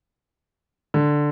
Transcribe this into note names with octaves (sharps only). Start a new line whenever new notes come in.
D3